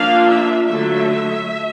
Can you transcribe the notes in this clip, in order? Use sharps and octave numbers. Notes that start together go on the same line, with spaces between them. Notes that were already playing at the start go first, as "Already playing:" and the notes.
Already playing: F3 A#3 D4 F4 F5
E5
D3 F#3 A3 E5